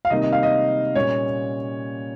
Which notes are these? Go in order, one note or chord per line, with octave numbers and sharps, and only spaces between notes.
F5
C3 D#3 G3 A#3 D#4 D#5
D#5
F5
D#5
A#2 G3 A#3 C#4 C#5